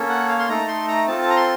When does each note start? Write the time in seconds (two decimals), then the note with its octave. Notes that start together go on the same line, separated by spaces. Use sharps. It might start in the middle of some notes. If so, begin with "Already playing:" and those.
Already playing: A#3 C#4 A4
0.09 F#5
0.29 F5
0.39 C6
0.49 A3 D#4 A4 A#5
0.68 C6
0.88 A#5
1.07 C4 F4 A4 A5
1.22 A5
1.30 A#5
1.36 C6